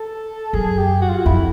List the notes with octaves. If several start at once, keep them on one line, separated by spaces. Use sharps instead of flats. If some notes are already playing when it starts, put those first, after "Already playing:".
Already playing: A4
F#2 G#4
G4
F#4
F4
F#4
F2 E4